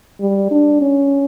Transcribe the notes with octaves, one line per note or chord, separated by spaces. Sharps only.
G3
D4
C#4